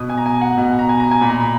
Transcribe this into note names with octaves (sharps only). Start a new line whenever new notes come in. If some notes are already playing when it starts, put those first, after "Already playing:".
Already playing: B2 D#6
G#5
A#5
G#5
F#5
B2
A#5
G#5
A#5
G#5
A#2 B5
A#5
B5